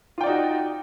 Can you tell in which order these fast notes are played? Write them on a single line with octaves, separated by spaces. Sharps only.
F4 G5 D5 D#4 F#4